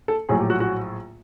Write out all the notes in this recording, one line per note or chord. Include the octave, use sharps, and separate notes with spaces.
A4
A#1 A2 F#3 G#4
G4
F#4
F#4